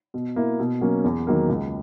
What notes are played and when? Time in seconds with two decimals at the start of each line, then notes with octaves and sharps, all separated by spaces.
0.14 B2
0.36 A#3 E4
0.59 B2
0.81 F#3 A#3 C#4
1.04 E2
1.27 D#3 F#3 A#3
1.49 C#2